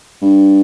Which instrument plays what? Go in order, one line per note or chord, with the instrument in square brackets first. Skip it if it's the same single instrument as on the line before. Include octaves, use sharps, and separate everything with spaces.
[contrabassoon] G2